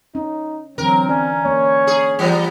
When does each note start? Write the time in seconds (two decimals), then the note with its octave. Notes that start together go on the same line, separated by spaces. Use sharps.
0.15 C#4 D#4
0.78 D3 E3 F#3 C4 A#4
1.09 C#4 D5
1.45 A#3 C#5
1.87 G#4
2.19 E3 G3 B3